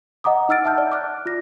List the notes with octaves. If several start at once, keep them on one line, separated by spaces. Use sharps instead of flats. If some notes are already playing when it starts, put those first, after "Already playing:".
D#5 F#5 A#5 D6 D#6
D#4 F#5 E6 F6 A6 D7
E5 F#5 A5 F6 G6
D5
D6 F6 F#6
F4 A#6